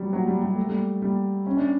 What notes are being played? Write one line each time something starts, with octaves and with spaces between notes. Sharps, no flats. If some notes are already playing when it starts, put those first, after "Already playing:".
Already playing: F#3 G3
F#3
G3
G3
A3
G3
G3
C#4
D4